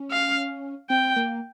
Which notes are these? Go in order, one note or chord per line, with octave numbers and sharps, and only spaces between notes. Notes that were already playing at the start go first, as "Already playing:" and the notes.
Already playing: C#4
F5
C4 G5
A#3